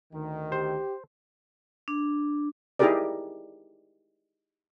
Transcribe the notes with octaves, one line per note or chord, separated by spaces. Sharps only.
D2 D#3
G4 C5
D4
D#4 E4 G4 G#4 A#4 D5